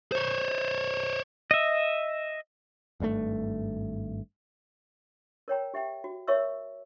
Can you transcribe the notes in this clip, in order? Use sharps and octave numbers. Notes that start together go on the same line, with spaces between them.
C5 C#5
D#5 E5
G#1 G2 C3 A3
A#4 C#5 G5 A#5
G4 E5 F#5 G5
F#4
A#4 C#5 E5 C#6 E6